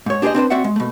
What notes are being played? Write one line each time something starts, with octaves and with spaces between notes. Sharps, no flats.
G#2 C#5
D4 G4 G#4 A#4 C5 D#5
C4 D4 B4 C5
C4 F#4 D5 E5 F#5
G#3
B2 A3